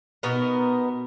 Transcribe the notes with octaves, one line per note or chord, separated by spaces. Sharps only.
B2 B3 D#4 A#4